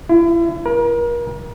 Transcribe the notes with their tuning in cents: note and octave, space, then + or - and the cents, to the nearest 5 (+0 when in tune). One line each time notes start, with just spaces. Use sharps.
E4 +35
A#4 +35